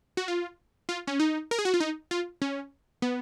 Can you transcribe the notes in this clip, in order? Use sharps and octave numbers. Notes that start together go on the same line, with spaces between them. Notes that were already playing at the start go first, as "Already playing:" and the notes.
F#4
F4
F4
C#4
D#4
A#4
G#4
F#4
F4
D#4
F4
C#4
B3